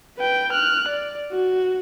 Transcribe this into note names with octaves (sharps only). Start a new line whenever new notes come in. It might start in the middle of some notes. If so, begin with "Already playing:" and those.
B4 G5
F6 F#6
D5
F#4